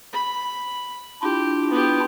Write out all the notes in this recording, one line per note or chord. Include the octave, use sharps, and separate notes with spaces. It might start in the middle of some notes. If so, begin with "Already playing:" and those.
B5
D4 E4 F4 G4
B3 G4